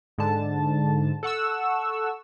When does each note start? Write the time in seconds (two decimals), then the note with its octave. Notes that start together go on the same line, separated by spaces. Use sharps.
0.18 G#2 D3 A5
1.23 A4 F#5 C#6 E6